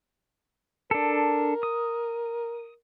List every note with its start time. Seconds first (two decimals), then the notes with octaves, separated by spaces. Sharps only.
0.91 D4 A4 A#4
1.63 D#6